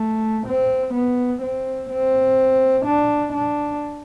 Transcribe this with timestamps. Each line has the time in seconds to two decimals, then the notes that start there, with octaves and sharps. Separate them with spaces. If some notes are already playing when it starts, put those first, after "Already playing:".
Already playing: A3
0.47 C4
0.94 B3
1.42 C4
1.90 C4
2.86 D4
3.33 D4